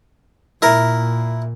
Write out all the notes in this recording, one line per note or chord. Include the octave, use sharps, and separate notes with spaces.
A#2 E4 A#4